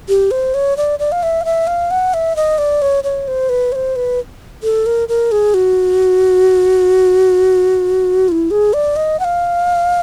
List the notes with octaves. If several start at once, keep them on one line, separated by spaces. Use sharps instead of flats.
G4
C5
C#5
D5
D5
F5
E5
F5
E5
F5
F#5
E5
D#5
D5
C#5
C#5
C5
B4
C#5
C5
B4
A4
A#4
A#4
G#4
F#4
F4
E4
G#4
D5
D#5
F#5
F5